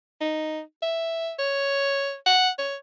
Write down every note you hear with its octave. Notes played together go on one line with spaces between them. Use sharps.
D#4
E5
C#5
F#5
C#5